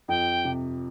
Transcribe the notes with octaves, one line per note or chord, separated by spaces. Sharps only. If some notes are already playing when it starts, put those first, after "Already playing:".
F2 G5
C3